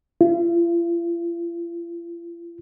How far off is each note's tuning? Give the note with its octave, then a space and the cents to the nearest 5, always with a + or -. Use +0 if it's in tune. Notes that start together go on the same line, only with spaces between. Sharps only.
F4 -45